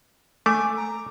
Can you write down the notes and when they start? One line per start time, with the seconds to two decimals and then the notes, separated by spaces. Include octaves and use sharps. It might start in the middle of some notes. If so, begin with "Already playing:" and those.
0.46 A3 G#5 D6
0.77 A#5